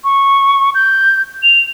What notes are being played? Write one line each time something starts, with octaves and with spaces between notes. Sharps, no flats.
C#6
G6
F7